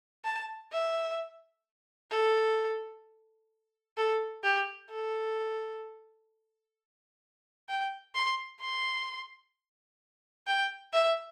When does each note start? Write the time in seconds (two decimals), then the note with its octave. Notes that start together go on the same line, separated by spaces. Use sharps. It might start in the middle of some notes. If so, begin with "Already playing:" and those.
0.25 A5
0.72 E5
2.11 A4
3.97 A4
4.44 G4
4.90 A4
7.69 G5
8.15 C6
8.61 C6
10.47 G5
10.93 E5